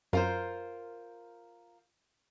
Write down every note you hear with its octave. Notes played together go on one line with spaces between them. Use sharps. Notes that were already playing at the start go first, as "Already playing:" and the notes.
F#2 F4 A#4 C5